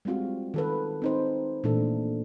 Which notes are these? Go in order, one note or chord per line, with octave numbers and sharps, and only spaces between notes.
G3 G#3 C4 F4 F#4
D#3 A4 B4
C4 D#4 C5
A#2 E3 A3 D4 A4